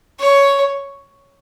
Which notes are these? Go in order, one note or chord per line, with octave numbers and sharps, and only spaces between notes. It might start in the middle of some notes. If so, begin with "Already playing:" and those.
C#5